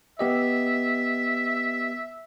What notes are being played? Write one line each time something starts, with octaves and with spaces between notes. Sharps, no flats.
B3 G4 D#5 E5